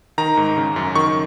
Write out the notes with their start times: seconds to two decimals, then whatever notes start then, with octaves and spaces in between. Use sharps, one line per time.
0.18 D#3 A#5
0.37 G#2
0.57 C#3
0.76 F#2
0.95 D#3 C#6